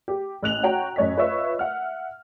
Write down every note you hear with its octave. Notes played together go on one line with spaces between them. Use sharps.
G4
A1 F#6 F7 F#7
F#4 C#5 G5 A#5
A1 F#2 C#5 D#5 B6
F4 B4 C#5 D#5 E5 C#6
E5 F#5 F6